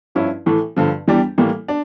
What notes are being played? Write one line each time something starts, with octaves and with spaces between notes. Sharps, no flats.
G2 F3 C#4 E4
A2 E3 A3
G2 D3 F3
E2 E3 G3 D4 G4
A2 E3 G3 A#3
D4